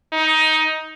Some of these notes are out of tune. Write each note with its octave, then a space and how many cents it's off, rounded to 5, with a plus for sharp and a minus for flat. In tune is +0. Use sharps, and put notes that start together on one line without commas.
D#4 +15